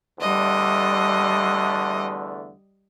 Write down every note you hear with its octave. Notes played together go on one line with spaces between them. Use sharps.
E2 D3 G3 A3 D#5